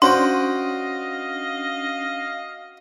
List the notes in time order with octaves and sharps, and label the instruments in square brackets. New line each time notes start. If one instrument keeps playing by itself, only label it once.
[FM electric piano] C#4 D4 [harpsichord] F#4 C5 G5 [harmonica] D#5 F5 [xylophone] C6